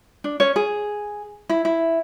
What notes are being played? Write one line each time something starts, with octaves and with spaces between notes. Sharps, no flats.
D4
C#4 C#5
G#4
E4
E4